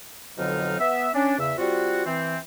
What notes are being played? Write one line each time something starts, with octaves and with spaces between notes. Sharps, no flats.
F2 B2 D3 F#3 D#4 F6
B3 E5
C#4 D4
E2 C#3 E5
G3 C4 F4 F#4
E3 C4